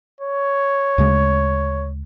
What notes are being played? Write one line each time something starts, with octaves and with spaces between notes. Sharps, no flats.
C#5
D2 C#3 G#3